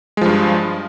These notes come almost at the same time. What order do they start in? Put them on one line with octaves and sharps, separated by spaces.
G#3 F3 G2